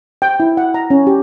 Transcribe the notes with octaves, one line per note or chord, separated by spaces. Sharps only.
G5
E4
F#5
A#5
C#4
G4